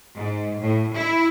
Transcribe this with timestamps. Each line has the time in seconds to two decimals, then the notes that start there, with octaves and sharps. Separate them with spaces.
0.16 G#2
0.62 A2
0.95 E4